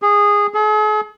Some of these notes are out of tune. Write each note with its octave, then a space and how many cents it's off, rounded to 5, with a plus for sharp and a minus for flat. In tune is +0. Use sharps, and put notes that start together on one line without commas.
G#4 -15
G#4 +45